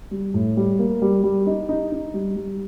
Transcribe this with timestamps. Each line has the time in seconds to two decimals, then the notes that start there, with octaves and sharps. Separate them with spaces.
0.11 G3
0.34 A2
0.57 G3
0.79 A#3
1.02 G3
1.23 G3
1.47 D#4
1.69 D#4
1.92 D#4
2.14 G3
2.36 G3